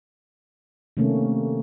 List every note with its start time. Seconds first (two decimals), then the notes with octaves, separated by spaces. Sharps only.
0.97 C3 D#3 A3 A#3 C#4